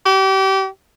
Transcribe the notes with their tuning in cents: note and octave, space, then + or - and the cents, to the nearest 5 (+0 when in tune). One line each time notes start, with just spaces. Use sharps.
G4 -30